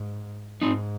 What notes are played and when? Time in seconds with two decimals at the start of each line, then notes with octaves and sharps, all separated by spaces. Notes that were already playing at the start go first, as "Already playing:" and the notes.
Already playing: G#2
0.62 G#2 C4 D#4